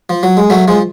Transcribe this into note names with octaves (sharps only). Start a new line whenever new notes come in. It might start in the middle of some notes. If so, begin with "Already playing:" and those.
F3
F#3
G#3
F#3 A3
F3 G#3